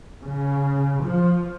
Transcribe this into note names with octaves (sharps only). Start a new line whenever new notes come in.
C#3
F3